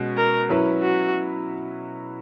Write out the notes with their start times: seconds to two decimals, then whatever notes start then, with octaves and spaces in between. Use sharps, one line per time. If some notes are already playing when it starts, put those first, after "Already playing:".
Already playing: B2 G#3 C#4
0.17 A#4
0.49 F#3 C#4 E4 B4
0.82 F#4